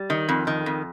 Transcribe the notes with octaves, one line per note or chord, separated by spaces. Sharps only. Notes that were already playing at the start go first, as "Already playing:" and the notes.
Already playing: G3
D#3
F2
D#3
F2